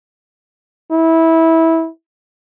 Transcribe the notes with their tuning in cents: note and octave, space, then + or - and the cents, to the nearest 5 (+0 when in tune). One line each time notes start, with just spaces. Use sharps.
E4 -20